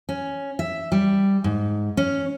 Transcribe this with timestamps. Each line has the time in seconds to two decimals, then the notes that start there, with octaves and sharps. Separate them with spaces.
0.09 C#4
0.59 E5
0.92 G3
1.44 G#2
1.97 C#4